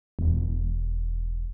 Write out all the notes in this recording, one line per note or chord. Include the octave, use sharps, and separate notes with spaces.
E1